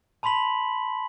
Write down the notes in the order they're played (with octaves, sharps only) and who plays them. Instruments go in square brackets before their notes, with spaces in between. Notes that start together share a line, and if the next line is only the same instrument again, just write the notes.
[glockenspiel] A5 B5 C6 B6 F#7